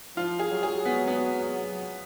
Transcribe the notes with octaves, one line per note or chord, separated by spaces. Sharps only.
F3 F4
G#4
F#3
G#4
B3
B3